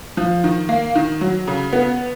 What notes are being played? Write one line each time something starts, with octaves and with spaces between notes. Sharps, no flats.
F3
D#3
A#3
D#3
F#3
C#3
B3